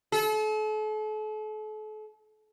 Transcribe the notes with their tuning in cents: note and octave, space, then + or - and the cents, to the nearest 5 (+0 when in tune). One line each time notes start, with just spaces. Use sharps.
A4 -40